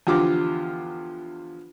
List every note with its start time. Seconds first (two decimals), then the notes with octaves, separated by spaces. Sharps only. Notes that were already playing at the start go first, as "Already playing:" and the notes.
0.07 E2 D3 F3 F4 G4 D6